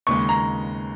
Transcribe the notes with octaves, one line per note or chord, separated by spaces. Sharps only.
D#2 C#3 G#3 C#6
A#5